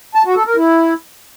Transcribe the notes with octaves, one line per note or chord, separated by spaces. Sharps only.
A5
F#4
A4
A#4
E4